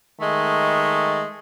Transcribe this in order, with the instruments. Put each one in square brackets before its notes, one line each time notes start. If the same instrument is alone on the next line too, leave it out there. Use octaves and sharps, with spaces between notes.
[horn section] D#3 G#3 A3